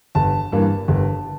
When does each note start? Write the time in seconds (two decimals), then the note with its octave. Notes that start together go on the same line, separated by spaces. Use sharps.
0.15 G1 A5
0.52 G2 E3 A#3
0.88 G1